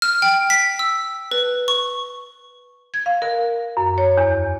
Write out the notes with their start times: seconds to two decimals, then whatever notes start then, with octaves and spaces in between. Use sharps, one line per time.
0.02 F6
0.22 G5
0.50 B6
0.79 E6
1.31 B4
1.68 C#6
2.94 G#6
3.06 F5
3.22 A#4
3.77 F#2
3.98 C#5
4.17 E2